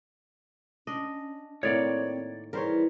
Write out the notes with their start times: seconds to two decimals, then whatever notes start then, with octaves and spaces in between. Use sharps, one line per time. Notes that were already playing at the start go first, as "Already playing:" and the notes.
0.87 C#4 D4 D#5
1.63 A2 D#3 A#3 C4 C#5 D5
2.53 E3 G3 G#4 A#4 C5 C#5